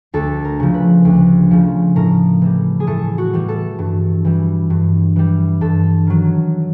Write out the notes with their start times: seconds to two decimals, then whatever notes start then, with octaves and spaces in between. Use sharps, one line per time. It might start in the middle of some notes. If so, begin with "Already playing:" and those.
0.14 D2 A4
0.44 A#4
0.60 C#3 F3
0.74 B4
1.05 D2
1.51 C#3 F3
1.96 A2 A#4
2.42 E3 G3
2.80 G#4
2.87 A2 A4
3.18 F#4
3.33 E3 G3
3.49 A4
3.79 G2
4.25 E3 G3
4.70 G2
5.16 E3 G3
5.61 G2 A4
6.07 D#3 F#3